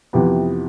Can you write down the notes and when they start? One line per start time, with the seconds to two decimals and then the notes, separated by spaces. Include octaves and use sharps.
0.13 F2 C3 E3 B3 G4